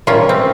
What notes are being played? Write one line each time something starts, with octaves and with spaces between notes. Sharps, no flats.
C3 G3 A#3 C#4 F4
C4